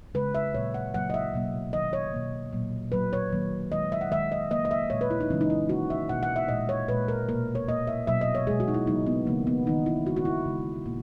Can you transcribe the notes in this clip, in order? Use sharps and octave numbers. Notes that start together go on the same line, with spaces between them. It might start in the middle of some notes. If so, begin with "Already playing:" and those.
C#3 G#3 B4
E5
A#2 F#3 A#3 C#5
F#5
C#3 F#3 A#3 F#5
D#5
E5
B2 F#3 A#3
D#3 F#3 A#3 D#5
C#5
B2 A#3
A#2 F#3 A#3
A#2 F#3 A#3 B4
C#5
D#3 F#3 A#3
D#3 G#3 D#5
E5
F#5
D#3 G#3 E5
D#5
C#3 F#3 A#3 D#5
D#5
E5
A#2 G#3 C#5
B4
E4
D#4
C#3 E3 G#3 C#4
D#4
E4
D#3 A#3 F#4
E5
B2 A#3 F#5
F#5
E5
A#2 G#3 D#5
C#5
A#2 G#3 B4
A#4
B2 A#3 A#4
C#5
A#2 A#3 D#5
E5
B2 F#3 A#3 E5
D#5
C#5
B2 G#3 G#4
F#4
D#4
E4
C#3 F#3 A#3 D#4
B3
C#3 E3 G#3 A#3
B3
D#3 A#3 D#4
E4
C#3 G#3 F#4
F#4
E4
C#3 G#3
A#2 A#3